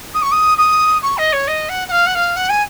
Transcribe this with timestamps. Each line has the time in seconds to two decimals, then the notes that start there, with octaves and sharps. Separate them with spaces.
0.14 D#6
0.22 C#6
0.32 D#6
0.58 D#6
1.03 C#6
1.18 D#5
1.33 C#5
1.48 D#5
1.69 F#5
1.88 F#5
1.91 F5
2.06 F#5
2.15 F5
2.36 F#5
2.49 G#5